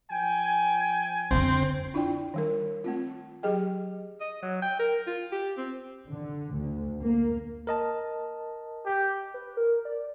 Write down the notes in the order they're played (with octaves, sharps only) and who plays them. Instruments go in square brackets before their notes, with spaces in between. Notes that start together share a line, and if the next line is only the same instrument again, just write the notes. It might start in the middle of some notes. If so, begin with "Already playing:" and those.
[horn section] F3 G5 G#5
[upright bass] F2 D3 [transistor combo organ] C4
[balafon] D4 E4 F4 D5 G5
D#3 G3 A#4
A3 C4 F4
F#3 G4 G#4 D#5 G5
[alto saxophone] D#5
F#3
G5
A#4
F4
G4
C4
[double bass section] D3
D2
A#3
[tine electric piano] A#4 D#5 A5
[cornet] G4
[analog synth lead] B4
A#4
D5